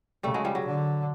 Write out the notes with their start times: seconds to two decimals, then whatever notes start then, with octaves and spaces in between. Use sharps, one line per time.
0.23 C#3 G3 A3
0.34 F#3 G#3
0.45 F3 G3
0.55 F#3
0.66 D3